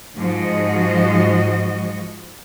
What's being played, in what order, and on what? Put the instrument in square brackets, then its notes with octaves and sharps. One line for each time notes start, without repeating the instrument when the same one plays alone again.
[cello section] G#2 F3 G#3 F#4 D#5